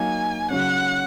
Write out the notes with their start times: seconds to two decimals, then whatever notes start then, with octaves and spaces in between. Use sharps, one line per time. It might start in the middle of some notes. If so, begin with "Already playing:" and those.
Already playing: F#3 A#3 D#4 G#5
0.51 C#3 F#3 C#4 F#5